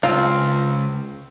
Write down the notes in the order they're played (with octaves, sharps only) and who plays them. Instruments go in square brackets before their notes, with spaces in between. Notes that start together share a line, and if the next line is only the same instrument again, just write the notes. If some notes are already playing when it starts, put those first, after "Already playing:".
[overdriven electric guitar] C#2 [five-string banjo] C4 F4